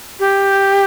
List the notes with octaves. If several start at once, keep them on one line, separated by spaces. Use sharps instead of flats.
G4